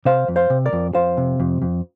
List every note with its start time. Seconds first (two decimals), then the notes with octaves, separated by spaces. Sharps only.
0.05 C3 C5 F5
0.28 F2
0.36 C5 F5
0.50 C3
0.66 A#4 D5
0.73 F2
0.95 F2 C5 F5
1.17 C3
1.40 F2
1.62 F2